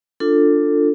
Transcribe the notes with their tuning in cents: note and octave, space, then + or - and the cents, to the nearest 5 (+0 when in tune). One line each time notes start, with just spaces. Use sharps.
D4 +0 F4 +0 A4 +20